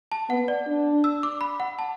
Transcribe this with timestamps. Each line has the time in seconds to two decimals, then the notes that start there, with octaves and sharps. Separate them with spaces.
0.12 A5
0.30 B3 F#5
0.48 D5
0.67 D4
1.04 E6
1.23 D6
1.41 B5
1.60 F#5
1.79 A5